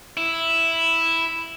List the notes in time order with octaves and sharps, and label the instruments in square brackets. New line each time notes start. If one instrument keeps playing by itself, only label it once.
[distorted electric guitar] E4